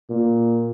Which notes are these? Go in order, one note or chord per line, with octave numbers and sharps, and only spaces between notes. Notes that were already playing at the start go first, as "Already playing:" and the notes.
A#2